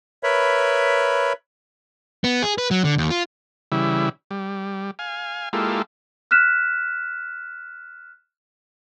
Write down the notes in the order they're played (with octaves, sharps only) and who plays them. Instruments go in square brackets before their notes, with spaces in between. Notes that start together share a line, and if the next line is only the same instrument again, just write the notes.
[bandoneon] A#4 B4 C#5 E5 B5
[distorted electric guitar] B3
G#4
B4
F#3
D3
D#2
F4
[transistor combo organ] C#3 E3 G3 E4
G3
F5 G#5
G#3 A#3 E4 F4 G4 A4
[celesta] F6 F#6 B6 E7